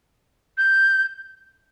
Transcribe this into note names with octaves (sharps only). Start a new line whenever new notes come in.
G6